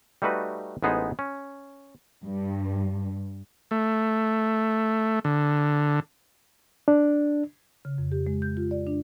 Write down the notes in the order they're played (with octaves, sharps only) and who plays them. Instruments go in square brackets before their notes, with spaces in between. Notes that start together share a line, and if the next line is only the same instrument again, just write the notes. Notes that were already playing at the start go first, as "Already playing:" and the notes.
[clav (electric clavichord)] G3 A3 D#4 F#4 B4
A1 G#3 B3 D#4 G#4 C5
C#4
[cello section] G2
[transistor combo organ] A3
D3
[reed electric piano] D4
[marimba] C#3
F2
G4
G#3
G6
F4
D5
D4